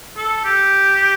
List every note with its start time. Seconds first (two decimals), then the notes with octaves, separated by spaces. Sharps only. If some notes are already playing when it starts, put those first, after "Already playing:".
0.16 A4
0.44 G4